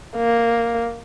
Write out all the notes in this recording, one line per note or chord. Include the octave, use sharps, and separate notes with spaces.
A#3